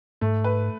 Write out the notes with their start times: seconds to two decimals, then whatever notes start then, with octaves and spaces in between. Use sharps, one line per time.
0.21 G#2 A3
0.44 B4